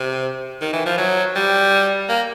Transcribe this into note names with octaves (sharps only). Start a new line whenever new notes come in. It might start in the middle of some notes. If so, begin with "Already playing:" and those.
Already playing: C3
D#3
E3
F3
F#3
G3
A#3